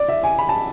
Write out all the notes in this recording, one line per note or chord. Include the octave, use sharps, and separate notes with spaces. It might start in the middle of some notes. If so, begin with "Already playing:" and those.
Already playing: D5
E5
G#5
B5
A5